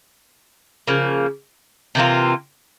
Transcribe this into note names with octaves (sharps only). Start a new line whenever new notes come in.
C#3 F3 A#3
C3 E3 A#3 F4